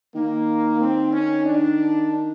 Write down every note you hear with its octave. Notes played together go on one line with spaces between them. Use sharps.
D#3 A#3
C4
C#4
D4